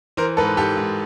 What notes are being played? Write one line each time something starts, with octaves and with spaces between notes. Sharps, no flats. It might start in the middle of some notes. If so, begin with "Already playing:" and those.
E3 A#4 C5
G#2 A4 B4
G#2 G4 A4
G#2